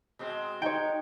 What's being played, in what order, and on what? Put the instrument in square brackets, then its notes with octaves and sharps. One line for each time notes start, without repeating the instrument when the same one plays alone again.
[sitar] B2 G#3 C4
[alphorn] D#4 [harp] C#5 G5